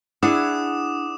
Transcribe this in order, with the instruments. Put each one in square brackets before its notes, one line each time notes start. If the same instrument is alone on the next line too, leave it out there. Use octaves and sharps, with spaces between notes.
[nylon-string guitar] D4 [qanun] E4 G#4 [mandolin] F#5 [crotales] D6 D#6 E7